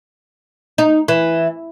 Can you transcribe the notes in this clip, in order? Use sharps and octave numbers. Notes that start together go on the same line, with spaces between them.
D#4
E3